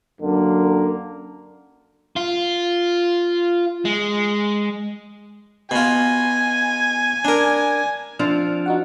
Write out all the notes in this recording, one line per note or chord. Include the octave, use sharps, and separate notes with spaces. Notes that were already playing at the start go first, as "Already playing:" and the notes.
F#2 D3 A#3
F4
G#3
B2 F4 G#5
D4 A#4
F3 C4 D4 F6
D#4 F#4 F#5